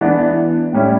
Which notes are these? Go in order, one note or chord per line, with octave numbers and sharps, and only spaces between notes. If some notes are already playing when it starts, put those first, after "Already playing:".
E3 B3 D4
A2 G3 C#4 E4